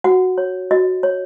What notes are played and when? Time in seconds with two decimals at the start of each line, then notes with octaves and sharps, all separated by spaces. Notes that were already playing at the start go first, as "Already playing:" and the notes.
0.04 F#4 F#5
0.38 C#5
0.71 F#4 D#5
1.03 C#5